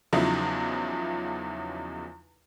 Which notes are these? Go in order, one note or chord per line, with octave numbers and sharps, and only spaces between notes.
E2 C#3 F3 F#3 D#4 E4